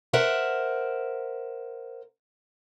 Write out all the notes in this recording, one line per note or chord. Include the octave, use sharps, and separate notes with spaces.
A#4 C5 E5 F#5